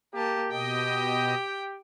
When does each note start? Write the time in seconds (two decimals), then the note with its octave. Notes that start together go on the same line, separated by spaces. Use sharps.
0.14 A#3 G4 A5
0.51 B2 G4 D#5 G5